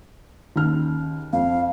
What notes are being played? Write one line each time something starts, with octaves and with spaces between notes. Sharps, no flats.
D#2 C#3 F6
F2 F5